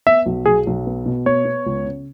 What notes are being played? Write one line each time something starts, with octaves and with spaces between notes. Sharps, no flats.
B3 E5
B1
B1 G#4
B1
B3
B2
B3 C#5
B3
C#2
C#3